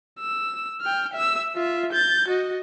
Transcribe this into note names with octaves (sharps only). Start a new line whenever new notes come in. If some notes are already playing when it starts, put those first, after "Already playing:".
E6
G5 F6
E5 E6
F4 E5
G6 A6
F#4 D#5